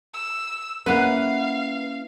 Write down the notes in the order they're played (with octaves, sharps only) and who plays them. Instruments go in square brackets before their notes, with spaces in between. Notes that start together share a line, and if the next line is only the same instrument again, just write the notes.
[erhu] E6
[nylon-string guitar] A#3 C#4 E4 [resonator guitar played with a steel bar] B4 F#5 [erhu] F5